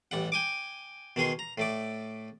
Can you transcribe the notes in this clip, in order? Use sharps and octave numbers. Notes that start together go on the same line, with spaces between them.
A1 G3 F#5
G5 G#5 D6
B2 D#3 G#4 C6
A#5
A2 A3 D5